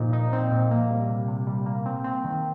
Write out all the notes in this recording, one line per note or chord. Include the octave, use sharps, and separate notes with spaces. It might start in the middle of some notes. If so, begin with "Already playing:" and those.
Already playing: A#2 F3 D#4
D#4
C4
A#2
A#3
G3
C3
C3
G3
A#3
C4
C4
D#3